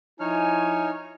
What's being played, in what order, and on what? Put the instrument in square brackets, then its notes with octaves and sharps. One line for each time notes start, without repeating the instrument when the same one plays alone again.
[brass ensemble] F3 E4 G#5 [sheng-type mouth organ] D#4 C#5 F6